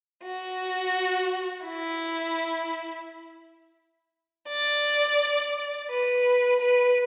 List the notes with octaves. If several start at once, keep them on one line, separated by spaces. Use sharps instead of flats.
F#4
E4
D5
B4
B4